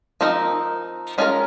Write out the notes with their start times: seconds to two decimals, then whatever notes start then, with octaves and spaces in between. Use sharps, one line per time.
0.21 F3 C4 D#4 A#4
1.18 G#3 C#4 F4 A#4